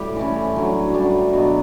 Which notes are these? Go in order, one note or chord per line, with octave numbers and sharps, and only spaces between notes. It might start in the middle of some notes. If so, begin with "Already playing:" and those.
Already playing: A2 G3 G4
E3 A3 C#4
D3 F#3 C#4
A2 G3 D4
B2 F#3 B3 F#4